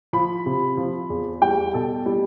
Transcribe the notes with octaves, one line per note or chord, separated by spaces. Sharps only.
F3 B5
C3
F3
E2
G3 G5
B2 A4
G3